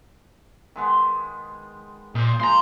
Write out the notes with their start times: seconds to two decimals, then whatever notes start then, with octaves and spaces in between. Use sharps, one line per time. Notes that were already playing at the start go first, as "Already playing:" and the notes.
0.76 D#3 G#3 B3
2.15 A#2 D#4 C5
2.40 F3 G#3 A#5 C6